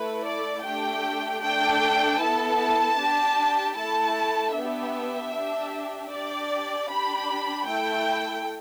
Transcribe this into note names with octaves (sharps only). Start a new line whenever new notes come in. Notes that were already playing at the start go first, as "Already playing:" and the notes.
Already playing: A3 E4 A4 B4
D5
A3 D4 G4 G5
A3 D4 A4 G5
B3 E4 A4 A5
D4 G4
A3 E4 A4 A5
B3 D4 G4 E5
D4 G4
D4 G4 D5
D4 G4 B5
A3 E4 A4 G5